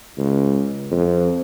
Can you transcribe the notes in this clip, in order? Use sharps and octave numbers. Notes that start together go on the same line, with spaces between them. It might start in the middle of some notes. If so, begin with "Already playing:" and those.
C#2
F2